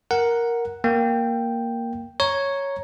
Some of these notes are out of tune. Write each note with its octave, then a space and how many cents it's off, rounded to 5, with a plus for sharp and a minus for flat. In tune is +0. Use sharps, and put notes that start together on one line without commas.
A#4 +5 F#5 +0
A#3 +0 G5 +0
C#5 +0 A#5 +0 C#6 +0